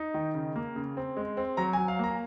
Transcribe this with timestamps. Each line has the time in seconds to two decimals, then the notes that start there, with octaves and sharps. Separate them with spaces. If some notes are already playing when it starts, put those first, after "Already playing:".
Already playing: D#4
0.14 D#3
0.35 C#3
0.56 A#3
0.76 C#3
0.97 C4
1.17 G#3
1.37 C4
1.57 F#3 A#5
1.73 F#3 G#5
1.88 F5
1.99 A#3 A#5